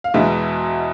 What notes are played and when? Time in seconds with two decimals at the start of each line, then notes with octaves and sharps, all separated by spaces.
0.04 F5
0.14 E2 B2 G#3 B3 E5